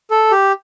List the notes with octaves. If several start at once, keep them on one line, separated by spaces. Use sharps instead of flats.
A4
G4